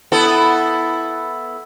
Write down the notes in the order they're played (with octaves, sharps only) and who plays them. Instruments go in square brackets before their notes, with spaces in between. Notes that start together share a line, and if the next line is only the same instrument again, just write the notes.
[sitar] B3 E4 A4